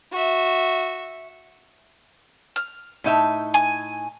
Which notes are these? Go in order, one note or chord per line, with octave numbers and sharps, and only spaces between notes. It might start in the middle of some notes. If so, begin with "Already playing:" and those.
F#4 E5
F6
A2 D#4 E5
G#5